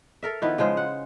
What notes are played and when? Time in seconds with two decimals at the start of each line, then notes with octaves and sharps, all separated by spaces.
0.23 A4 A#4 E5
0.42 D#3 F3 B3 E4
0.58 C#3 F3 G#3 C5
0.77 F#5